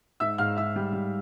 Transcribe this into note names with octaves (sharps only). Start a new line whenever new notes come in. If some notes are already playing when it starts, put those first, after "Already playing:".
G#2 E5 E6
G#2 F5 F6
G#2 E5 E6
G3
G3